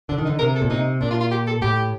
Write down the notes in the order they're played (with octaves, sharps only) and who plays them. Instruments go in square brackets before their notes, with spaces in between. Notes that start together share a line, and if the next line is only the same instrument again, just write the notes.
[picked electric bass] D3 [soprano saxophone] D4
[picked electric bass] D#3
[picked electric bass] D3 [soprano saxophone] D#4
[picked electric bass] C3 [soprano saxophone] A#4
[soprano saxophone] A4
[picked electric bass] A#2
[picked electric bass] C3 [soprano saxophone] D#4
[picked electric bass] A#2 [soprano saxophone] D4
[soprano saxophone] F4
F4
G4
A4
[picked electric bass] A2 [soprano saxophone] G4